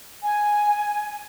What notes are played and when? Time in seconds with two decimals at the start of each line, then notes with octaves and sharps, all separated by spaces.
0.23 G#5